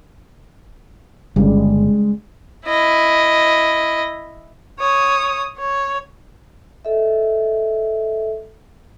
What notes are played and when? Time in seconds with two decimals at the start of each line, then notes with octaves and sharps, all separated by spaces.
1.36 G1 C#3 G3 G#3
2.67 E4 D#5
4.79 C#5 D#6
5.58 C#5
6.85 A4 D#5 E5